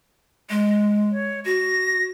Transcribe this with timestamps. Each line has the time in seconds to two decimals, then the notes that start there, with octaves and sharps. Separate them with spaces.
0.50 G#3
1.12 C#5
1.45 F#4 A#6